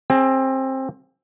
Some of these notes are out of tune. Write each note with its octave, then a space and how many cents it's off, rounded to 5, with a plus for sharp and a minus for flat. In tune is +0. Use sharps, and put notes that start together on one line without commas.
C4 +20 G#4 +0